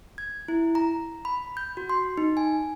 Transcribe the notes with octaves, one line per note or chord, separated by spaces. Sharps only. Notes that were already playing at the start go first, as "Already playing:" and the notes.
G#6
E4
A#5
B5
G6
F#4
C6
D#4
G#5